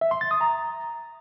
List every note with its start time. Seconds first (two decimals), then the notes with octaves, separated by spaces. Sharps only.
0.01 E5
0.11 C6
0.21 A6
0.31 D#6
0.41 A#5